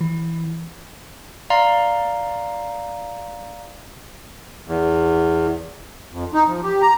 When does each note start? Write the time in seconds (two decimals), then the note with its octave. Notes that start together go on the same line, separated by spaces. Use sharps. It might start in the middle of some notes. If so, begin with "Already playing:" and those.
0.01 E3
1.50 D5 F5 A#5 C6
4.68 E2
6.11 F2
6.33 D#4
6.48 F3
6.63 G4
6.82 A#5